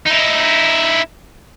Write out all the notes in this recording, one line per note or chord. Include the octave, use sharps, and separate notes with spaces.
D#4 E4